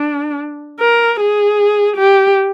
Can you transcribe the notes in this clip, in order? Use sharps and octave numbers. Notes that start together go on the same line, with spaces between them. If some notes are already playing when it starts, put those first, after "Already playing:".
Already playing: D4
A#4
G#4
G4